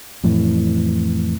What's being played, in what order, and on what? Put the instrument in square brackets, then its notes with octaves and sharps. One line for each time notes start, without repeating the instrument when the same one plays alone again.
[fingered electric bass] F2 A2 E3